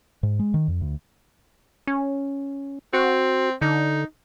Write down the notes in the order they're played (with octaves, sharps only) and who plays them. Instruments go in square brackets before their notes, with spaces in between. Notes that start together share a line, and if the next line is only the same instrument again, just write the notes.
[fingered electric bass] G#2
G#3
D#3
F2
D2
[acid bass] C#4
[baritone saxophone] C4 [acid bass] F#4
[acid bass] D3 [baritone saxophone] D#4